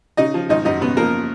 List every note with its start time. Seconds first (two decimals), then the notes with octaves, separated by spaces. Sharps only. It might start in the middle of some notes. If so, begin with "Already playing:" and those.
0.17 C#3 D#4 D#5
0.34 F3
0.49 G#1 D#4 D#5
0.65 F#2 D#4 D#5
0.81 C#3 B3 B4
0.97 F3 A#3 A#4